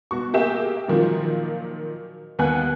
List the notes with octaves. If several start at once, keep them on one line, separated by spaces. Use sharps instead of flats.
B2 F#4 C#6
A#3 G4 G#4 E5 E7
A#2 D#3 F3 F#3 A#3
D#2 B3 F#5 G#5 F#6